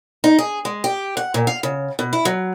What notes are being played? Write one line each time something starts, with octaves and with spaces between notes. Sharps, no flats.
D#4
G#4
G#3
G4
F#5
A#2
F5
C#3
B2
E4
F#3